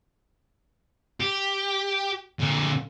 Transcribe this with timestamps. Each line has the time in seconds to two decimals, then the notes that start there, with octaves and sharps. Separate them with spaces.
1.20 G4
2.39 A#2 D3